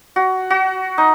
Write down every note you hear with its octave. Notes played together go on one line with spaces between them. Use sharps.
F#4
F#4
D#4